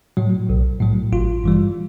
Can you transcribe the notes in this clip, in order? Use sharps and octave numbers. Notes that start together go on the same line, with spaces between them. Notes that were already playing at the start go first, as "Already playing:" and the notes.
A2 F#3
B1
A2 F#3
G#1 F4
G2 E3 G3